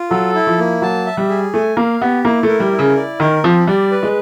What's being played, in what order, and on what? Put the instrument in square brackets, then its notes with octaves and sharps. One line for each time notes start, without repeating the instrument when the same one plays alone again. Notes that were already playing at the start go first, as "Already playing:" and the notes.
Already playing: [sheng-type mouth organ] F4
[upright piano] F#3 [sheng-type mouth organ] A4
[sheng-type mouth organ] E4
[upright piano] F3
[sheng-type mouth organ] A#3
[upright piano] F#3 [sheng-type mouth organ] A5
[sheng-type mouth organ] E5
[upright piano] G3
[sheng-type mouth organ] G#4
[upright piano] A3 [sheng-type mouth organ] G#5
[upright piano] A#3 [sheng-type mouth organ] F5
[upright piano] B3 [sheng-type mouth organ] G4
[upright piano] A#3 [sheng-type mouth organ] E4
[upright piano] A3 [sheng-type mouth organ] A#4
[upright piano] G3
[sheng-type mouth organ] E4
[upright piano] C#3
[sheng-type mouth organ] D5
[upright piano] D#3 [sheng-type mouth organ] A#4
[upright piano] F3 [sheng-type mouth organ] C4
[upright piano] G3 [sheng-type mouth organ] D5
[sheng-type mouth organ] B4
[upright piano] G#3